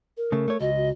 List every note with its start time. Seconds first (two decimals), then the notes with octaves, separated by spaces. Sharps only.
0.17 A#4
0.32 C#3 A3
0.48 A3 C#5
0.60 C#2 F#4 D#5
0.76 F#4